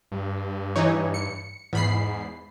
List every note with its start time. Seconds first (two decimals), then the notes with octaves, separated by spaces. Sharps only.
0.12 G2
0.76 E3 D#4 C#5
1.14 C#7
1.73 E2 G#2 B5 C7